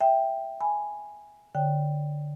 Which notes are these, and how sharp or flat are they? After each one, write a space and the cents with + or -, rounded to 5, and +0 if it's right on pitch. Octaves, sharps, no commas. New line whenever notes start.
E5 +0 G5 +0
G#5 +0 B5 +0
D3 +0 C#5 +0 G5 -5